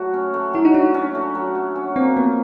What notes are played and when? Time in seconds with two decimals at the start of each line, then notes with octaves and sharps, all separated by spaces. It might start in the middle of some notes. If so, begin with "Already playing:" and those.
Already playing: F#3 A3 F#4
0.14 C#4
0.34 A3
0.53 F#3 E4
0.65 D#4
0.74 D4 F#4
0.94 C#4
1.15 A3
1.35 F#3
1.55 F#4
1.76 C#4
1.96 A#3 C4
2.16 F3 B3